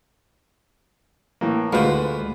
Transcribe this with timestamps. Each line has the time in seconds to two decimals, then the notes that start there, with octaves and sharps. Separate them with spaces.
1.41 A2 E3 A#3
1.73 D2 D3 G#3 F4 F#4 B4 C5 F5